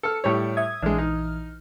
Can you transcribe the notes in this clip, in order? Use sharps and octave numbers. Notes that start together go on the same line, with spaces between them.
A4 F6 C#7
A2 G3 C#5
E5 D#6 G#6
A#1 E3 G#3 D4 F6
D#4